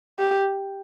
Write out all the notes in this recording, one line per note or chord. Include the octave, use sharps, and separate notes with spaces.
G4